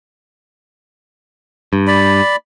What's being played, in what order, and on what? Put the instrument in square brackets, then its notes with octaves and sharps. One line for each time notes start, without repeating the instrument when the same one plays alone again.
[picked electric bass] G2
[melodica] D5 B5